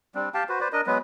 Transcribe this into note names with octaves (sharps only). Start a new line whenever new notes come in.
G3 C4 D4
G4 F5 G5 A5
F#4 B4 C5
B4 C5 D5
D4 A#4 D#5
F#3 G#3 B3 B4